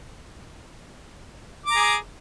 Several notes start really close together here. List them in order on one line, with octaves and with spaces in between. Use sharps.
D6 A#5 G#4